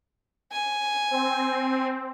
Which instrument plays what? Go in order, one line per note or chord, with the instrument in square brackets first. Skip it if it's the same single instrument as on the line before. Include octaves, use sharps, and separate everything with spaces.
[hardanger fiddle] G#5
[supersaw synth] C4